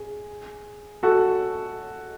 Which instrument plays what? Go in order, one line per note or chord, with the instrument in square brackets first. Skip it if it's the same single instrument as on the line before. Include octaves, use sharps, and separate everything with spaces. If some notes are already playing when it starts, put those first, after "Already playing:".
Already playing: [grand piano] G#4
F#4 A4